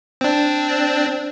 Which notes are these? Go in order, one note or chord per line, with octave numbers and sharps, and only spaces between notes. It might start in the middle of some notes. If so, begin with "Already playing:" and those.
C4 D4